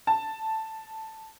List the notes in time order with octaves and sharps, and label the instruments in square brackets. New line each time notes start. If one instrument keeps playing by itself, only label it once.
[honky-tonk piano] A5